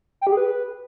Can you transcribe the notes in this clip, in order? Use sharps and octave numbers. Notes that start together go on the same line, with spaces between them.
G5
G4
G#4
B4